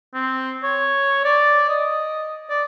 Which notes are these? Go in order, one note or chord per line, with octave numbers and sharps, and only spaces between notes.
C4
C#5
D5
D#5
D5